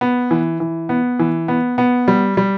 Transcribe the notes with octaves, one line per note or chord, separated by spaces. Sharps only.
B3
E3
E3
B3
E3
B3
B3
G3
G3